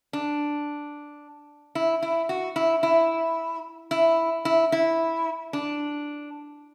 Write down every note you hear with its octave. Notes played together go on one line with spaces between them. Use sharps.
D4
E4
E4
F#4
E4
E4
E4
E4
E4
D4